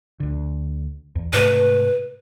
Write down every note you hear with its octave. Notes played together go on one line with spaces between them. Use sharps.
D2 D3
E2
G#2 C3 A3 B4